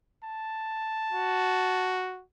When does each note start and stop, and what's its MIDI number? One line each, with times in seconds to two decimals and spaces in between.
0.24 2.08 81
1.12 2.22 66